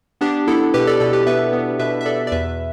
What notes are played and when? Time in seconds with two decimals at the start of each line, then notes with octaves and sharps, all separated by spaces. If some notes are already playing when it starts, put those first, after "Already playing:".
0.21 B3 D4 G4
0.47 B3 E4 A4
0.74 B2 G4 B4
0.87 A4 D5
1.00 B2 A4 D5
1.13 G4 B4
1.26 B3 B4 E5
1.53 B3
1.79 B2 B4 E5
2.01 E5
2.06 B2 A4 D5
2.27 D5
2.32 E2 B4 E5